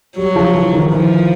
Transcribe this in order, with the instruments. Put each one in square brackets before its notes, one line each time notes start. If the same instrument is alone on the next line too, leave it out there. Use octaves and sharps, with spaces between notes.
[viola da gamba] F#3 [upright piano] G3
[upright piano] F3
E3
D#3
[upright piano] E3 [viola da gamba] F3